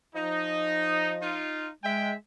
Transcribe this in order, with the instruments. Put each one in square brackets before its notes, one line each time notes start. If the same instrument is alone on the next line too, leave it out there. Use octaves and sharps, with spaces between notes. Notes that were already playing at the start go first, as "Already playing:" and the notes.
[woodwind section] F3 D#5 [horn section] D#4
[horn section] D#4 F4
[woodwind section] G#3 [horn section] G#4 E5 G5